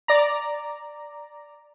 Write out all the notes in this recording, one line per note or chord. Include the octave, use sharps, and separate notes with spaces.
D5 A#5